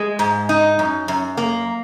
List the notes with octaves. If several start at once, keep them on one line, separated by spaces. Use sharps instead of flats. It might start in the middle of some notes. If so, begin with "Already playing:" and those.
Already playing: G#3
G#2
D#4
F#2
F#2
A#3